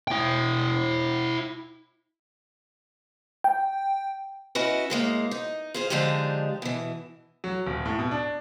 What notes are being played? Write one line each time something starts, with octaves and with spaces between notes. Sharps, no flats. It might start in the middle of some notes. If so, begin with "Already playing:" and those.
E4 G5
G5
C#4 E4 F#4 B4 D#5
A2 G#3 A#3
D#4
F4 G#4 C5
D3 F3 G#3 D4 D#4 G4
B2 E3
F#3
D#1
A2
B2
D4